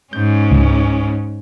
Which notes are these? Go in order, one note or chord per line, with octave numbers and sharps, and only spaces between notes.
G#2 C#4 G6
C#2